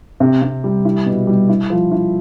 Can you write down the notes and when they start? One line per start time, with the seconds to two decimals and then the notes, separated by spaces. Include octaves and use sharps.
0.20 C3
0.42 C3
0.64 G3
0.85 E4
1.06 B2
1.27 G3
1.49 E4
1.70 F3
1.91 E4